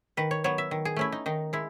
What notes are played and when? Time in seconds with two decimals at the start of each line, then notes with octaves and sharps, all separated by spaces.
0.17 D#3 B4
0.31 C#5
0.44 F#3 B3 C#5
0.58 E5
0.71 D#3
0.85 G#4
0.96 A3 C#4 E4
1.12 D#4
1.26 D#3 D#4
1.53 G#3 E4